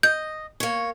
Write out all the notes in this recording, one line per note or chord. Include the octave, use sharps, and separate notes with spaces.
D#5 G6
A#3 C#5